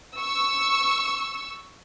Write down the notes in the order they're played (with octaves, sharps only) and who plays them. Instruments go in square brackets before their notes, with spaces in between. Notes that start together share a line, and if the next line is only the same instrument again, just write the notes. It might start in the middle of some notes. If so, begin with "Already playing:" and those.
[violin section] C#6 E6